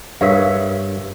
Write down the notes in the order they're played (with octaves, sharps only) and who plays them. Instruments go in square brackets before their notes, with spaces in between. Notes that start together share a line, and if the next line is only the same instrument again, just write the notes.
[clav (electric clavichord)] G2 C#5 E5 [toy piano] A#4 F5